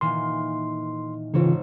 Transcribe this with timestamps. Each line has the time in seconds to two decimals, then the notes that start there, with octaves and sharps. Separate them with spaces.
0.01 A#2 D#3 E3 C6
1.34 G#1 C#3 E3 C4 F4 C#5